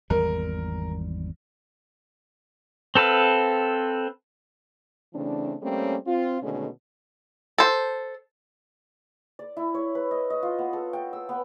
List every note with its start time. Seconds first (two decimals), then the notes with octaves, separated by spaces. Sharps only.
0.10 G#1 E2 G3 A#4
2.95 C4 A4 B4 F5
5.14 C#3 E3 A3 C4 D4
5.62 G3 A3 A#3 C4 C#4
6.06 C4 F4
6.42 B2 D3 D#3 G#3 A3 C#4
7.58 A4 C5
9.39 D5
9.57 E4
9.74 C#5
9.95 B4
10.11 D#5
10.30 D#5
10.43 F4
10.58 B3
10.73 A4
10.93 G5
11.13 E6
11.29 B3